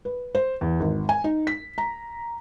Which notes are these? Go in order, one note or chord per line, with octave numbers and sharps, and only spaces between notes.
B4
C5
E2
G#1
G#5
D#4
B6
A#5